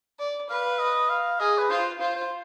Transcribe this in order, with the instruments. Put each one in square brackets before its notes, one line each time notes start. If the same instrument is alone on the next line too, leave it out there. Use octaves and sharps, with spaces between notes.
[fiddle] D5
[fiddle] B4 [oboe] F5
[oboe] D#5
F5
[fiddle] G#4 [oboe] D#5
[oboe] B4
[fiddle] F4 [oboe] C5
[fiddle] F4 [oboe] C5
[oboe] C5